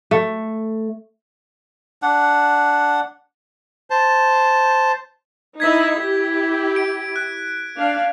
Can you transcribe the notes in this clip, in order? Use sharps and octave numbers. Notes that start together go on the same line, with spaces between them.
A3
D4 F#5
C5 A5
D#4 E4 G#6 B6
E4 G4
D7
F#6
D4 F5